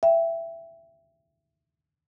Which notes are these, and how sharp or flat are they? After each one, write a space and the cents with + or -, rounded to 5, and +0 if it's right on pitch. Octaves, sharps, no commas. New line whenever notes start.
E5 +15 G5 +0